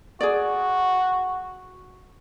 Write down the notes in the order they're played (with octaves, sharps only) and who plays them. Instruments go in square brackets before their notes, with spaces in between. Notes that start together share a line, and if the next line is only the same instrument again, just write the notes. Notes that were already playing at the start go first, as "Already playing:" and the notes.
[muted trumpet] F#4 [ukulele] G#4 D5